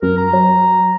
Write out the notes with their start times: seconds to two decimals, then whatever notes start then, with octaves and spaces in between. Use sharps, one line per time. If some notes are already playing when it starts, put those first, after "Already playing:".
0.02 F#2 A#4
0.18 A#5
0.33 F#3